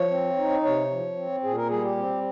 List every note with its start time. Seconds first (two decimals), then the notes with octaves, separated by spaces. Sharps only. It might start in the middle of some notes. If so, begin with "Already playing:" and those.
Already playing: F3 C#5
0.10 C4
0.37 D#4
0.64 C3 C#5
0.91 F3
1.16 C4
1.43 A#2 G#4
1.56 A#4
1.68 G3 G#4
1.83 G4
1.97 C4